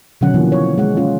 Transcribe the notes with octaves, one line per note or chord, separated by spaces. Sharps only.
B2 D3 D#3 F#3 C#4 F#5
E3 F3 A#3
C#5
G#3 F#5
G#3 C#4 F4